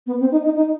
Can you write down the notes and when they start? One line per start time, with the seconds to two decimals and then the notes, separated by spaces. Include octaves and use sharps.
0.07 B3
0.20 C4
0.32 D#4
0.44 D#4
0.56 D#4